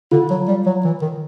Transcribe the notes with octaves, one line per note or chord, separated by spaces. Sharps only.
D3 F4
F#3
G3
F#3
E3
D#3